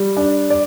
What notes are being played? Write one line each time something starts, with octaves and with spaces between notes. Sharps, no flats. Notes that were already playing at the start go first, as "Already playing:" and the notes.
Already playing: G3
D4
D5